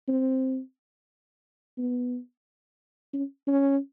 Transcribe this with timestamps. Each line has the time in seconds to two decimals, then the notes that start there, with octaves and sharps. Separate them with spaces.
0.08 C4
1.78 B3
3.13 C#4
3.47 C#4